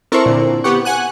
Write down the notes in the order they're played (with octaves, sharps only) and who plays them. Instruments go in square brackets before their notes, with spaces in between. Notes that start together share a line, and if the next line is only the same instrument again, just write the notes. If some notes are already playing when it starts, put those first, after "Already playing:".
[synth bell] C4 E4 C5 [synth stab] A4 A#4 C#6
[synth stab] A#2 D3
[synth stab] B3 G4 F#5 [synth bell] C#6
[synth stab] F#5 G#5 F#6